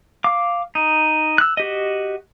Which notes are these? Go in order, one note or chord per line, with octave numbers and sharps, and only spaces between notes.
F5 D6
D#4
E6 F#6
F#4 G4 D#5